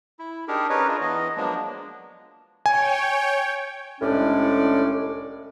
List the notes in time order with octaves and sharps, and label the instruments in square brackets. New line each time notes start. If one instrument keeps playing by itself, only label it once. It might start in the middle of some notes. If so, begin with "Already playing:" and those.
[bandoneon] E4
D4 D#4 G4 G#4 A#4
C#4 D#4 A#4 B4 C#5
D4 F4 G#4
E3 B3 D#5
F3 F#3 G#3 A#3 B3 D4
[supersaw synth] C#5 G5 [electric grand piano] G#5
[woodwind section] C2 A2 G#3 C#4 D4 D5